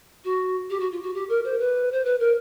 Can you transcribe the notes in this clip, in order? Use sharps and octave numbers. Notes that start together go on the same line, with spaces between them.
F#4
G4
F#4
F4
F#4
G4
A#4
C5
B4
C5
B4
A#4